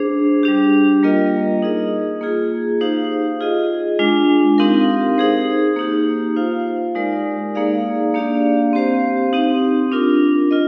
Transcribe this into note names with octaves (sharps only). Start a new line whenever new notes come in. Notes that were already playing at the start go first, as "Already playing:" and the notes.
Already playing: D4 G#4 C5
G3 D4 G4
G3 A#3 F4 A#4 D#5
D#4 G#4 D#5
A#3 F4 G#4
D#4 G4 C5 F5
F4 G#4 D#5
G#3 D4 F4
C4 D#4 G4 A#4 F5
D#4 G#4 C5
A#3 D#4 G4
F4 C5 F5
G#3 D#4 G4 A#4 D5
A#3 D#4 G#4 D5 F5
A#3 D4 G4 D5 F5
C4 G4 C5 F5
C4 D#4 G4
D4 F4 A#4
F4 A#4 D#5